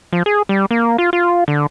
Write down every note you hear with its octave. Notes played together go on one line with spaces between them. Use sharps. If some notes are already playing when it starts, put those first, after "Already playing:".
F3
G#4
G3
A#3
F4
F4
D3